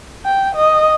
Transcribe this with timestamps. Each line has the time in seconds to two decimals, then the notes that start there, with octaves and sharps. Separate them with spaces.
0.25 G5
0.55 D#5